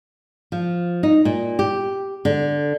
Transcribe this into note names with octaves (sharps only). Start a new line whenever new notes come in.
F3
D#4
A#2
G4
D3